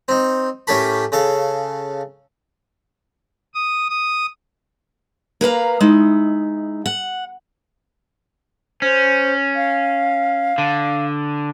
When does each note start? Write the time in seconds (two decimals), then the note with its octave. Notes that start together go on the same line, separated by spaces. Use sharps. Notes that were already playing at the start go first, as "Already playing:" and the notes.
0.08 C4 D#4
0.67 A2 C#4 G4 A#4 A5 B5
1.12 C#3 A4 F5
3.54 D#6
3.89 D#6
5.41 A#3 B4 F5 A#5
5.80 G#3 D#4 E4
6.86 F#5
8.82 C#4 C5
9.55 F5
10.58 D3